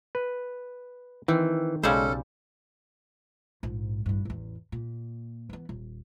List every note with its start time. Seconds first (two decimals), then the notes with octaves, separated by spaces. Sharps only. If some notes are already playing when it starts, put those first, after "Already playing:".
0.15 B4
1.28 D#3 E3 C4
1.83 B1 C#3 G3 G#3 C#4 A4 C5
3.63 A#1 G#2
4.06 A1 G2
4.25 A1 E2
4.72 A#2
5.50 E3 B3
5.69 D#1